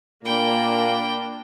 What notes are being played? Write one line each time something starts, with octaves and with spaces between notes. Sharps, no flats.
A#2 A#3 D4 G5 B5